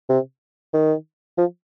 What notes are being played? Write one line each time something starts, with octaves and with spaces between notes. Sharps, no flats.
C3
D#3
F3